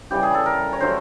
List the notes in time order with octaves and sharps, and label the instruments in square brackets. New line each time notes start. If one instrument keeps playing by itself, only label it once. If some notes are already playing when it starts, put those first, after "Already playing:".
[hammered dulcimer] C#3 E3 G3 G4
G#4
A4
A#4
C#5
D3 F#3 A3 C5